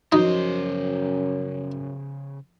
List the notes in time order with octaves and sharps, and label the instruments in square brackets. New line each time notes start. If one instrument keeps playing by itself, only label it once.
[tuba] F#2 [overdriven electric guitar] C#3 C5 [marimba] F3 F#4 D#5 [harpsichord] D#4